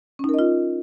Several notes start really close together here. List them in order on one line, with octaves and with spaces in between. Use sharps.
C#4 D#4 A#4 D#5 F4